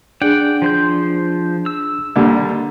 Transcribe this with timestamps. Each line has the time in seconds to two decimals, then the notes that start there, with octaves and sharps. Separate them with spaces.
0.22 D4 G#4 D5 F#5 G5
0.62 F3 C5 G6
1.66 E6
2.16 D#2 D3 G3